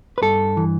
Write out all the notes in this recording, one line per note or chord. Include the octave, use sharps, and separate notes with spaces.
B4
G2 A4
E3